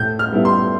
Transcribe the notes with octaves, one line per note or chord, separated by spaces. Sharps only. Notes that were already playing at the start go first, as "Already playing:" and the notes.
Already playing: A2 G6
F6
G3 B3 E4
C6